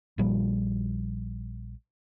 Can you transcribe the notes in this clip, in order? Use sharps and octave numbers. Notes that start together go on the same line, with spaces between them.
A#1 A#2 F3 G3